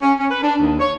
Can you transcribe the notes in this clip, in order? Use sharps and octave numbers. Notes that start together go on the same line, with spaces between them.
C#4
C#4
B4
D4
D#2
C#5